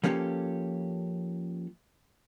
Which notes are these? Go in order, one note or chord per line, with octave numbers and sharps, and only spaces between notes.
F3 A#3 C#4 G4 A4